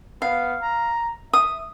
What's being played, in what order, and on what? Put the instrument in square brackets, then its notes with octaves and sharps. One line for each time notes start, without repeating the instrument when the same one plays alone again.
[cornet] B3 [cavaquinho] F5
[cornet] A#5
[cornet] E5 [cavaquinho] D#6